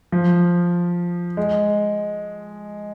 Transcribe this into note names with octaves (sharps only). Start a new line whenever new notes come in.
F3
G#3